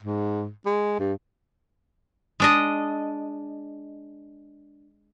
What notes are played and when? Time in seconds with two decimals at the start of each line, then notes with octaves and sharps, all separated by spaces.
0.03 G#2
0.65 G#3
0.99 G2
2.40 G#3 D4 D#5